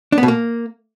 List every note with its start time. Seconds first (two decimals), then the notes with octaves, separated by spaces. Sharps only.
0.12 D4
0.18 B3
0.23 B2
0.28 A#3